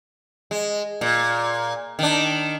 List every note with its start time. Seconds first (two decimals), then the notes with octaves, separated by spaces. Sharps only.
0.51 G#3
1.01 A#2
1.99 D#3 D4